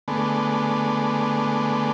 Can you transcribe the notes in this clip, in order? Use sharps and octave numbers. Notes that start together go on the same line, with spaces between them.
D3 G#3 A3 B3